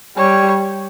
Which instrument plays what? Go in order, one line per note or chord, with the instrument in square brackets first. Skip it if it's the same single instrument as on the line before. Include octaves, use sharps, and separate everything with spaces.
[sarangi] G3 [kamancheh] C#5